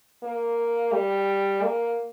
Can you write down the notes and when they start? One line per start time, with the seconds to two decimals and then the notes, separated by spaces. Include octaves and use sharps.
0.23 A#3
0.93 G3
1.63 A#3